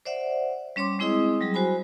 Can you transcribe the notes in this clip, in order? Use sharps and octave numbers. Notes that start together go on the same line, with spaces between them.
C5 D5 E5 F#5
G3 C#4 C#5 C6 D6
G#3 C4 E4 G#4 D#5 D#6
F#3 G3 G#4
F#4 C5 G#5 B5